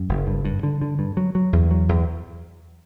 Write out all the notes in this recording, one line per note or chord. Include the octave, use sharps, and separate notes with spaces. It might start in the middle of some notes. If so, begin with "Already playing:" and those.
Already playing: F#2
F#1
G2
G2
D3
D3
G2
F#3
F#3
E2
F#3
E2